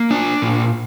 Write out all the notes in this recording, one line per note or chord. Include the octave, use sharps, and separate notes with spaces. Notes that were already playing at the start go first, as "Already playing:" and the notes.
Already playing: A#3
D4
A#2